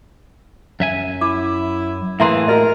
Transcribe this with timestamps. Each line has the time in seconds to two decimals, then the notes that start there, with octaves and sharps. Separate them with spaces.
0.80 F#2 E5 G#5
1.21 E4 D6
2.20 A2 E3 A#3 G#4 E5 A#5 C6
2.48 F#4 A#4 D#5